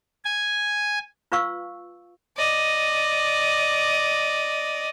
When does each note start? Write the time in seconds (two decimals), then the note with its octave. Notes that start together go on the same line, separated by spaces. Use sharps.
0.25 G#5
1.32 F4 B4 F5 C#6 E6
2.37 D5 D#5